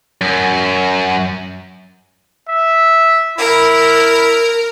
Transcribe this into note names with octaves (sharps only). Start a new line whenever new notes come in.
F#2
E5
E4 A#4